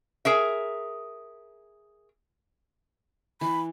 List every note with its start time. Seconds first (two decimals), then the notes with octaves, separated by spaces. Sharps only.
0.25 G#4 A#4 E5
3.41 E3 B5